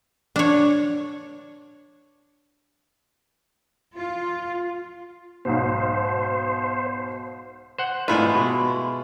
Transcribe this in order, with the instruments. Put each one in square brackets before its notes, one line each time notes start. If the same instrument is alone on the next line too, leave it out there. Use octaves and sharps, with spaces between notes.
[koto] D4 C#5
[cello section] F4
[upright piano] B1 G#2 B2 [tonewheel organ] C5
[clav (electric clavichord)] C5 F#5
[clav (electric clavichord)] G#1 A2 B4 [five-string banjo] G#3 E4 F4
[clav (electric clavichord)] B2